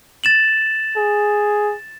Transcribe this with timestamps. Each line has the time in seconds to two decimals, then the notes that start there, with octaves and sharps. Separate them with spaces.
0.24 A6 E7 F#7
0.97 G#4